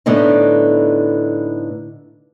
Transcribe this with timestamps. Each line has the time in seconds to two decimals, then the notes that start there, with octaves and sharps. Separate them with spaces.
0.06 A2 D3 B3 D#4